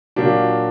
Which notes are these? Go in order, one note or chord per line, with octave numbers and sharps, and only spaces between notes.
A#2 F#3 A#3 D4 G4